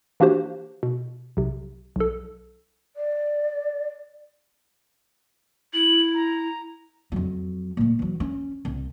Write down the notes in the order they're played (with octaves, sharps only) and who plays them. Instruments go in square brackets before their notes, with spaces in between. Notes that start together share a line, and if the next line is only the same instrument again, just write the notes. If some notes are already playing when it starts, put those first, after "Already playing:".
[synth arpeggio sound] E3 A#3 D4 F#4 G4 C5
B2
B1 C3
B1 A4
[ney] D5
[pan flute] E4 [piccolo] F#7
[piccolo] A#5
[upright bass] F2 F#3
A#2 A3
E3 F#3
C#4
C2